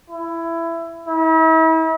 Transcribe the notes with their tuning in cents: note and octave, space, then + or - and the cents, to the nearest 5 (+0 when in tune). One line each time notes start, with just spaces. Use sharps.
E4 +15
E4 -40